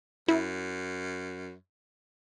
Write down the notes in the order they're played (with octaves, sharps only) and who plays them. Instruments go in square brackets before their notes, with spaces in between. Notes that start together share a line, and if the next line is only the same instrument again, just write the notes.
[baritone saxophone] F#2 [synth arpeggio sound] E4